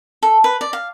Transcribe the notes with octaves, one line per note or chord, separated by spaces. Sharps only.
A4
B4
D5
F5